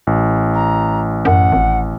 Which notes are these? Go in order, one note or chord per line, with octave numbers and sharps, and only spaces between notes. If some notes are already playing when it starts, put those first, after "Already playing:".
A1
A#5
F#2 F#5
G#1